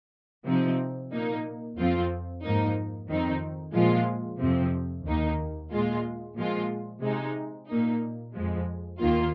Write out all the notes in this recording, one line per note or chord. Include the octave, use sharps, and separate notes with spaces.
C3 F3 C4 D#4
A#2 A#3 D#4
F2 F3 C4 F4
G#2 F3 A#3 D#4
F2 D#3 C4 D#4
A#2 F3 G#3 F4
F2 C3 F3 C4
D#2 D#3 A#3 D#4
A#2 G#3 F4
A#2 F3 G#3 F4
C3 G#3 D#4
A#2 A#3 D#4
F2 F3 G#3
D#2 D#3 A#3 F4